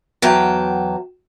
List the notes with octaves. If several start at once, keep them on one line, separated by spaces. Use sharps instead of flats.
E2 F#3 G5 A5